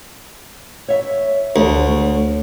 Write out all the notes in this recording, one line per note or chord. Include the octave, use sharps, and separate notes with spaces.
C#5 E5
D2 C#5